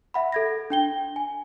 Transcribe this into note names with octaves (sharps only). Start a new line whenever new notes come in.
E5 F#5 B5
A4 G#6 A#6
D4 G5 G7
G#5